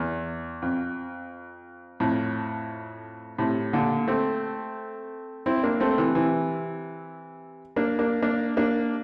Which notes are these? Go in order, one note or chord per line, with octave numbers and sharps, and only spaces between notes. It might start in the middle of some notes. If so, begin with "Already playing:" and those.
Already playing: E2
F2
F2 A2
A2 C3
A#2 D3
A3 C4
C4 E4
A#3 D4
A3 C4
C3 E3
C3 E3
A#3 D4
A#3 D4
A#3 D4
A#3 D4